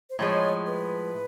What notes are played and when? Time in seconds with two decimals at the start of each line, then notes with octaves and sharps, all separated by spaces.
0.10 C5
0.19 A2 F3 G#3 C#5
0.66 B4